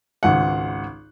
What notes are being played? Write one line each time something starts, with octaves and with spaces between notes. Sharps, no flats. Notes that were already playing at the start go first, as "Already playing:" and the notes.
G#1 C#2 F#5